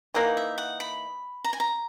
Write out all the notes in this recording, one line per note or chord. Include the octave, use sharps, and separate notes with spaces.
E3 A#3 D#4 F#5
E5
F#5
B5
A#5
G#5
A#5